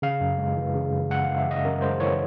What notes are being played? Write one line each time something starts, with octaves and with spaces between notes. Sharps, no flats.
C#3 F5
F#2
G#3
E3
C#3
F#2
G#3 F#5
F5
E3
E5
C#3 D#5
F#2 A#4
G#3 C5
E3 C#5